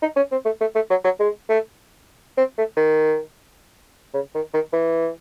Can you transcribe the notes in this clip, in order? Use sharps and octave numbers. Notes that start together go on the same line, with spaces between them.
D#4
C#4
C4
A3
A3
A3
F#3
F#3
G#3
A3
C4
A3
D#3
C#3
D#3
D#3
E3